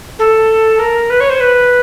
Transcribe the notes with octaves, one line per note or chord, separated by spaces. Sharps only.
A4
A#4
B4
C#5
C5
B4